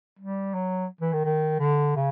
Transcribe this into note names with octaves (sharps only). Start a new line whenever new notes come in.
G3
F#3
E3
D#3
D#3
D3
C#3